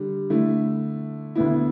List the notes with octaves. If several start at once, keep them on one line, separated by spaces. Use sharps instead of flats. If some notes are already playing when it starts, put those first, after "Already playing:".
Already playing: D3 G3
D3 A3 E4
D2 D3 B3 E4